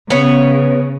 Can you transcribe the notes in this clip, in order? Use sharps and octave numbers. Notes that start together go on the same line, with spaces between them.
C#3 B3 C#5